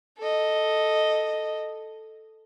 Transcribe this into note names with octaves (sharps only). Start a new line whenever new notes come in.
A4 D#5